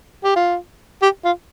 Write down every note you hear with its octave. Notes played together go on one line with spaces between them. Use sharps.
G4
F4
G4
F4